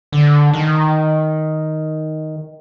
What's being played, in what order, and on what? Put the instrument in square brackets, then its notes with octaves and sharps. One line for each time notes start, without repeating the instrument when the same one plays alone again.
[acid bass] D3
D#3